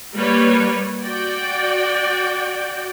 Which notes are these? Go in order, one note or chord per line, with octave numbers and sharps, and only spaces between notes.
G3 A#3 B4 C#5
F#4 D5 G5